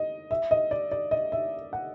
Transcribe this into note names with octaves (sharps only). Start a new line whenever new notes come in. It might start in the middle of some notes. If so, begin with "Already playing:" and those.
Already playing: D#5
E5
D#5
D5
D5
D#5
E5
F#5